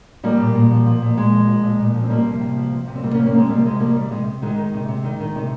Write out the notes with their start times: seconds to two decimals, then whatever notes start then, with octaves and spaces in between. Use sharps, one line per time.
0.23 F3 G3 A#3
0.40 A#2
0.55 A#2
0.71 F3
0.86 F3
1.02 A#2
1.17 A#2 G#3
1.33 F3
1.47 F3
1.64 A#2
1.80 A#2
1.94 F3
2.04 C4
2.10 F3 G3 A#3
2.26 C3
2.41 C3
2.56 F3
2.72 F3
2.87 C3
2.95 C4
3.03 C3 G3 A#3
3.15 A#3 C#4
3.19 F3
3.26 A#3 C#4
3.35 F3 G#3 C4
3.50 C3 G3 A#3
3.66 C3 G#3
3.80 F3 G3 A#3
3.96 D#3 G3
4.11 C3 G#3
4.27 C3
4.42 D#3 G#3
4.58 D#3
4.74 C3
4.88 C3
5.04 D#3
5.20 D#3
5.35 C3